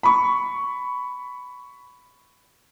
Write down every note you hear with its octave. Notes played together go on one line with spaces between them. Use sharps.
B5 C#6